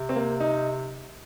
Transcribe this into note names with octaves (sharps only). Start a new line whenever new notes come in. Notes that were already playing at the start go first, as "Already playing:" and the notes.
Already playing: C3
C4
A#3
D#4